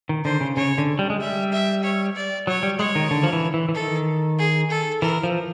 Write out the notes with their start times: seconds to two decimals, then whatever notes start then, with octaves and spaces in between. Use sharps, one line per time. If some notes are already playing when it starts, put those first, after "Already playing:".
0.09 D#3
0.24 D3 C5
0.41 C#3
0.56 C#3 C#5
0.78 D3
0.99 G3
1.10 G#3
1.20 G3 E5
1.52 E5
1.84 C#5
2.16 D5
2.47 F#3 C#5
2.63 G3
2.79 G#3 C#5
2.95 D#3
3.11 D3
3.23 F3
3.33 E3
3.54 E3
3.69 E3
3.74 D#3 A4
4.38 G#4
4.70 A4
5.02 E3 A#4
5.23 F3